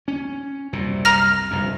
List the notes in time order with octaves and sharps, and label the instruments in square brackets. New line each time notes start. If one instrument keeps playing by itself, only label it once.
[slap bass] C#4
C2 F#2 A#2
[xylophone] A#5 F6 A#6
[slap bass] F1 C2 G2